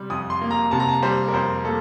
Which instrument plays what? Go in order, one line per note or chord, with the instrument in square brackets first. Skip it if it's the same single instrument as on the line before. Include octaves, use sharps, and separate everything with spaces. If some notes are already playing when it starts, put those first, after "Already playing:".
Already playing: [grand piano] C3 G3
F2 D#6
C6
A#3
A#5
C3 A5
A#5
A5
G3 C5
A#4
F2 C5
A#3 A4